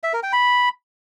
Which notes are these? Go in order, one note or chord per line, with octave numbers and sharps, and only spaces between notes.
E5
A#4
G5
B5